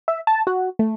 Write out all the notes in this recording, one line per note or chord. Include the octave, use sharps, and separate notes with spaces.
E5
A5
F#4
A3